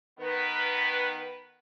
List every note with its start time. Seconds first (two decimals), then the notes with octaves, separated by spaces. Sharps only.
0.19 D#3 B3 B4